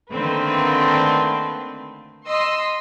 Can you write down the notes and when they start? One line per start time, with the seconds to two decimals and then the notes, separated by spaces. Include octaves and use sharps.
0.12 D3 D#3 A3 A#3 C4 B4
2.26 D#5 C6 E6